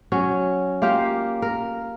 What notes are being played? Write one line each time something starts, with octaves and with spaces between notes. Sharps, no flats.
F#3 C#4
A#3 F4 G4 F5
A#4